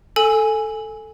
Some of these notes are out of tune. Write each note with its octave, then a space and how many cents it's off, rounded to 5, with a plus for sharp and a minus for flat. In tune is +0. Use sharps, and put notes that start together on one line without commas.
A4 +0 G#5 +0 E6 -20